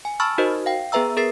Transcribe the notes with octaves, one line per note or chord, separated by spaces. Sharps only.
G#5
A5 B5 C#6 E6 F6 A6
D#4 F#4 A#4 C5 D#5
F5 G5
B3 G#4 B4 E5 A#5 E6
G#4 A#4 A6 C7